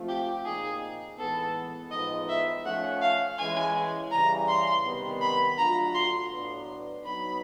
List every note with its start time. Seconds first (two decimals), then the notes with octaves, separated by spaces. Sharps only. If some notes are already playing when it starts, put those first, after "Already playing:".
Already playing: F3 A3 C4 F4
0.09 G4
0.45 A#2 F3 A#3 D#4 G#4
1.18 A2 E3 G#3 B3 A4
1.91 A2 F3 G#3 B3 D#4 D#5
2.28 E5
2.65 F3 A3 C#4 F#5
3.02 F5
3.38 E3 G#3 C#4 E4 G#5
4.11 C#3 E3 G3 A#5
4.48 C6
4.84 C3 D#3 G3 B3
5.21 B5
5.57 D3 F#3 A3 D4 F4 A#5
5.95 C6
6.31 A2 F#3 B3 D4
7.04 F#3 B3 D#4 B5